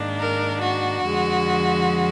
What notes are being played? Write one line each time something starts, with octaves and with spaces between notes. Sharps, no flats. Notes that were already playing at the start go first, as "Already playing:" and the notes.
Already playing: G#2 D#3 A#3 D4
A#4
F#4
F2 D3 F3 G#3